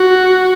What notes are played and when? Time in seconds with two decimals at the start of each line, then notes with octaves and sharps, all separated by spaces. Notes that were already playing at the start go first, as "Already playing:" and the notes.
Already playing: F#4